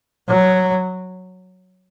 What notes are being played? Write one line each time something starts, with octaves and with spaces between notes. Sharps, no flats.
F#3